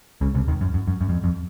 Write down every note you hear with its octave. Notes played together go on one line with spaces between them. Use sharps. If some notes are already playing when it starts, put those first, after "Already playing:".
C#2 C#3
C2 C3
D#2 D#3
F#2
F#2
F#2
F#2
F2
F2